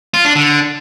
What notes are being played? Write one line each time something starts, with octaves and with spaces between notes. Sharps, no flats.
F4
D4
D3